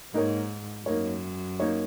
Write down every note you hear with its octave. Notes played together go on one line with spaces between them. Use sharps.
G#2 A#3 D#4 A#4 C#5
F#2 A#3 D#4 A#4 C#5
A#3 D#4 A#4 C#5